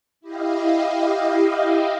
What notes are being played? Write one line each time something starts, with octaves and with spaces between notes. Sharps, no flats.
E4 G4 D#5 F5